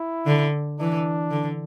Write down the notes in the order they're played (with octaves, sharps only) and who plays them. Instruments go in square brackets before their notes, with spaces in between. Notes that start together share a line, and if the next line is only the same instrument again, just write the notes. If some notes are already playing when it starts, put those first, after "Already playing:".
Already playing: [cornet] E4
[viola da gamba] D3
[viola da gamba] E3 [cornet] D4
[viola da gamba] D3